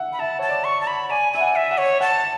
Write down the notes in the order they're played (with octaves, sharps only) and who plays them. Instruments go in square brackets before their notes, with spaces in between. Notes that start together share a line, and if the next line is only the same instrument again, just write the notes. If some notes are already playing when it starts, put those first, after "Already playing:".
Already playing: [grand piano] E5 F#5
[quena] B5
[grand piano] E5 [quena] A5
[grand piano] C#5 [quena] A5
[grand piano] D5
[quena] C#6
A5
B5
[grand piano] D5 [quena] G#5
[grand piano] E5 [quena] G#5
[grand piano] F#5
[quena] E5
[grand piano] F#5
[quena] C#5
[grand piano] F#5 [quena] A5